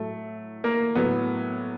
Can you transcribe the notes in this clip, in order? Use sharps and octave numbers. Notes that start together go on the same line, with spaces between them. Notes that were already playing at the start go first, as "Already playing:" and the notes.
Already playing: A2 F#3 A3
A#3
A2 F#3 B3